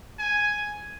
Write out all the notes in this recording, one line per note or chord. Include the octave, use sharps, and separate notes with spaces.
G#5